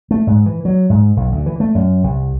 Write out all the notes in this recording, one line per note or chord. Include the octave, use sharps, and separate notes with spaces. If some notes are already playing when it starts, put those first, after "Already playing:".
A3
G#2
E3
F#3
G#2
B1
D2
E3
A3
F#2
C2